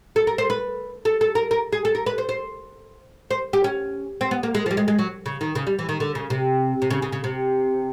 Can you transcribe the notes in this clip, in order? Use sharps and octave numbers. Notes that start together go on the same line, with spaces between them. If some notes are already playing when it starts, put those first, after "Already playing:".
A4
A#4
C5
B4
A4
A4
A#4
A#4
G#4
A4
A#4
B4
C5
C5
C5
G4
C#4
C4
B3
A#3
G#3
F3
G3
G#3
G#3
F#3
C#3
D#3
C#3
G3
E3
D#3
D3
C#3
C3
C3
C#3
C#3
C#3
C3